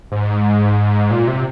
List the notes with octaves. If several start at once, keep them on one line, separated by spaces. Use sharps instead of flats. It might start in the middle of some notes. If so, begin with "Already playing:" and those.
G#2
A#2
C3